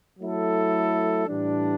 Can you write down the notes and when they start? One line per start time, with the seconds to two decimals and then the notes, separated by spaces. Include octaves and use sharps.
0.19 F#3 A3 E4 A4
1.28 A2 E3 G3 D4